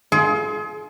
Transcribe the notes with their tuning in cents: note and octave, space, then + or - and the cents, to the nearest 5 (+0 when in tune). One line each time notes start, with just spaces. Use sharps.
F4 +0 G#4 +35